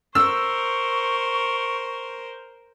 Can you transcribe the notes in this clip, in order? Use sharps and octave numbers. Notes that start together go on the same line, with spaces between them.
A#4 C5 C#6 E6